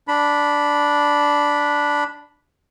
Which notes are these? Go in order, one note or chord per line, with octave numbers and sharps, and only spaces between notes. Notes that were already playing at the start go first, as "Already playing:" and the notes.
D4 B5